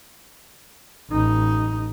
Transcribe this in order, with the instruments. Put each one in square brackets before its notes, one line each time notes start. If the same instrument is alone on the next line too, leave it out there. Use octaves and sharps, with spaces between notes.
[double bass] A1 D#4